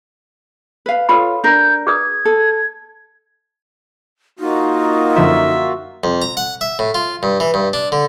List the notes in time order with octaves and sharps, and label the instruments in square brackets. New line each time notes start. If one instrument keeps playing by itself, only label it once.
[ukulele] B4 F5
[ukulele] F4 C#5 F5 [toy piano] A4 B4 B5
[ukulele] D4 A#4 [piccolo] G6
[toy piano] G#4 B4 D#6 [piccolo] G#6
[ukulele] A4
[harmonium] A#3 F4 F#4 [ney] D#4
[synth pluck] F#2 D3 F3 [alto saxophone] E5
[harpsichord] F2
A#5
F#5
E5
A2
F4
G2
E3
G2
D4
D3